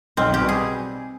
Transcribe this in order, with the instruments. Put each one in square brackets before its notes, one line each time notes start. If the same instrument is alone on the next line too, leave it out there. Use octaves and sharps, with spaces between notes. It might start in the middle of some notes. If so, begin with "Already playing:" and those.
[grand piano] B1 [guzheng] C4
[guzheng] G4
[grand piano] B2 G3
[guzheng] G#4